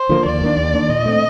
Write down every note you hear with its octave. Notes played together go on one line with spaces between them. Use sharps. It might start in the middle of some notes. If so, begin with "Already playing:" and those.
Already playing: C5
D3 F3 A#3
D#2 D5
D#3 A#3 D4
D#2
D#3 A#3 D4
A#2 D#5
A3 C4